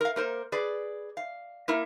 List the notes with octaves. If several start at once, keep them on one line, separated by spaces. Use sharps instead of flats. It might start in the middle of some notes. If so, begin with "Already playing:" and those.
A#4 F5
A#3 A#4 C5
G#4 B4 D5
F5
A#3 E4 A#4